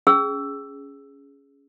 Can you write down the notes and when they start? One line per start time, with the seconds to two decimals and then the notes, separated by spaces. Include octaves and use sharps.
0.07 C#4 G#4 E6